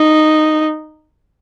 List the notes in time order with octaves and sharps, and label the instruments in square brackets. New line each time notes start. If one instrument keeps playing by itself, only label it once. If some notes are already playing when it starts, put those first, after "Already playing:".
Already playing: [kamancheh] D#4